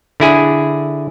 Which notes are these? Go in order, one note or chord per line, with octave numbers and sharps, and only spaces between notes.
D3 E4 G#4